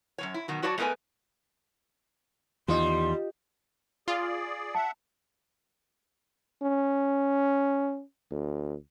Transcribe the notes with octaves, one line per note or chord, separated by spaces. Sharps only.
F#2 F3 C#5
E4
B2 D#3 F#3
F#3 F#4 C#5 D5 E5 A5
G#3 A3 B3 A#4 B4 G#5
E2 D#3 G3 F4 D#5 C6
F4 G#4 D5
E5 F#5 A5
C#4
D2